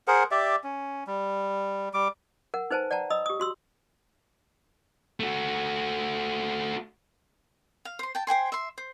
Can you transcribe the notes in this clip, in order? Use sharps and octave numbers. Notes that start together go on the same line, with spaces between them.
G#4 A#4 C5 F#5
G4 D5 E5
C#4
G3
G3 D6
A#4 F#5
D#4 B4 C5 G#5 A5
D5 F#5 G5 A5 A#5
D#5 B5 D#6 E6
G4 D#6
F#4 C6 E6
A3 F#4
F5
C5 C6
G5 A5
C5 G5 G#5 C6
E5 C6
C5